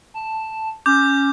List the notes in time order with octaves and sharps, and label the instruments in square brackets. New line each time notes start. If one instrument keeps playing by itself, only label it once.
[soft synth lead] A5
[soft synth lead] C#4 [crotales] D6 G6